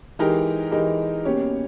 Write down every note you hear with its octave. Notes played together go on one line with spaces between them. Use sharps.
E3 G#3 D#4 G4 A#4
E3 G#3 D#4 G4 A#4
B2 A#3 C#4 G4 C#5